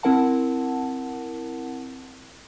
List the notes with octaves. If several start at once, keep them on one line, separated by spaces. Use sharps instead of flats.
C4 E4 A#4 F#5 A5